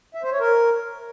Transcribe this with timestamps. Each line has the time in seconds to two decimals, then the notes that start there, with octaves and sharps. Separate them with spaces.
0.15 E5
0.23 C5
0.32 C#5
0.40 A#4